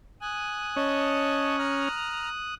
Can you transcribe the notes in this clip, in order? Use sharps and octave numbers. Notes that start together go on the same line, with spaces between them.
G#5 D#6 F#6
C#4 C#5 D#5 A5
A#5 F6